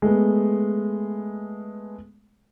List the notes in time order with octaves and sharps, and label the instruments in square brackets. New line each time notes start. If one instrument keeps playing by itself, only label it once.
[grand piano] G#3 A3 B3